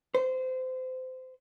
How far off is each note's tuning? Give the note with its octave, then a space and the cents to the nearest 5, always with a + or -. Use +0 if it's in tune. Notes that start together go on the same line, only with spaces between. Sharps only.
C5 -25